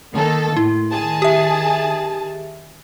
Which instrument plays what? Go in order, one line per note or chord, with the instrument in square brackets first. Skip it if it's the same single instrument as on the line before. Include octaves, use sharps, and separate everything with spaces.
[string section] D#3 A#3 A4
[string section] A2 [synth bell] E4
[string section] D#3 G#4 A5
[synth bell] G4 E5